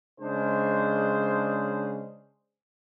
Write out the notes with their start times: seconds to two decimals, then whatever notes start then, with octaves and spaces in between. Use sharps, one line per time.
0.21 C#3 G#3 D4 G#4 C5